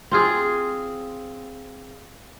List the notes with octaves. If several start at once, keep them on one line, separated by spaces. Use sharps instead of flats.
C4 F4 G#4